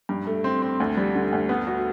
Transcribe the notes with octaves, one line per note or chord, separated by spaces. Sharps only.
G2
A3
C4
C4
D2
G3
D3
D2
B3
F#4